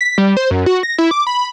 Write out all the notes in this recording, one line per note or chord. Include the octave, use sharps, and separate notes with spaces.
B6
G3
C5
F#2
F#4
A#6
E4
D6
B5